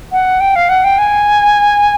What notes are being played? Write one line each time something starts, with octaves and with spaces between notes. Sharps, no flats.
F#5
G5
F5
F#5
G5
G#5